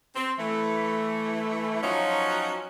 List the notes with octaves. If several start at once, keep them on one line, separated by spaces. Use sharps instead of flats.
C4
E3 A3
F3 F#3 C#4 D#4 F4 F#4